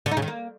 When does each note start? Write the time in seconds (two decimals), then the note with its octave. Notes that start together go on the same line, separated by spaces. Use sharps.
0.06 D3
0.11 D#4
0.17 C#3
0.22 D#3
0.28 A#3